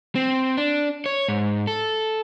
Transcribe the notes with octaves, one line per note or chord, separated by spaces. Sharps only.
C4
D4
C#5
G#2
A4